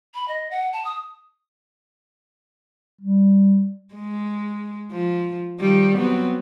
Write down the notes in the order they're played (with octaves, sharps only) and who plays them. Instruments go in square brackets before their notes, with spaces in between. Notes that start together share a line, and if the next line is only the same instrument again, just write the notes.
[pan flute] B5
D#5
F#5
A5
D#6
[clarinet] G3
[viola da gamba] G#3
F3
D#3 F3 G3
F#3 B3 C4